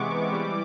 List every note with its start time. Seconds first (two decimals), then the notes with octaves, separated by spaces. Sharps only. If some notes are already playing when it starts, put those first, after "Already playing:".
Already playing: C3 E3 G#3 B3 C#6 D6
0.32 E3 G3